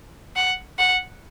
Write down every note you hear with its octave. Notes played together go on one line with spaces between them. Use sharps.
F#5
F#5